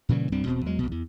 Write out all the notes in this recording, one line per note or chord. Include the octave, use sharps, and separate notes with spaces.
A#2 C#3 E3 G3
C2 G2 G3 C4
E1 B2 C4
E2 F#3 G#3
B1 B2
E2